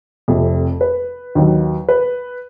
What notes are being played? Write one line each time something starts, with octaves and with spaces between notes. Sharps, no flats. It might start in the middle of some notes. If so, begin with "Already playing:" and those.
F1 F2 C3
B4
D#2 D#3 F#3
B4